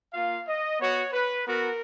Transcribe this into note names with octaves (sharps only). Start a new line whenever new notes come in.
A#3 F4 F5
D#5
B3 F#4 C#5
B4
B3 F#4 A#4